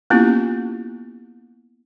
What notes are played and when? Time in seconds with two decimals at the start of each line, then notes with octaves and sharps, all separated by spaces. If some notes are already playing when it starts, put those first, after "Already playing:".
0.10 A#3 B3 C#4 E4 F4 G4